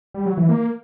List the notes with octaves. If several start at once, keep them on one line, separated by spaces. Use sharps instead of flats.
G3
F#3
E3
A#3